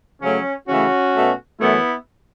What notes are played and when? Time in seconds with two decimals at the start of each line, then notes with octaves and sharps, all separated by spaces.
0.22 C#3 F#3 A3 C#4
0.68 C#3 E3 A3 C#4 F#4
1.14 B2 A3
1.60 F#2 E3 A3 B3 E4